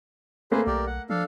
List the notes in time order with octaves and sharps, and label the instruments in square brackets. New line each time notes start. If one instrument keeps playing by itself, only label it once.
[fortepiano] A3 A#3 [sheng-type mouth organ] G#4 B4 C5
[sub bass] B1 [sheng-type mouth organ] G4 A#4 D5
[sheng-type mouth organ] F#5
[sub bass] F3 [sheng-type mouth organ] D4 A4 F5